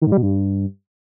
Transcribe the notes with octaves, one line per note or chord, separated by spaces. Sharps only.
D#3
G#2
G3
B2
G2